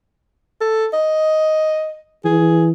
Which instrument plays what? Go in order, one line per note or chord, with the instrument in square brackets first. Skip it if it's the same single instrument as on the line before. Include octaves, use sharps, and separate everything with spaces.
[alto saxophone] A4
D#5
[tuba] E3 [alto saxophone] G#4